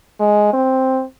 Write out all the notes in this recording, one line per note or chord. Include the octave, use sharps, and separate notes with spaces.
G#3
C4